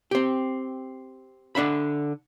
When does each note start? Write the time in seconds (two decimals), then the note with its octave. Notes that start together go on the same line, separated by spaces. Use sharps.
0.11 C4 G4
1.55 D3 D4 E5 B5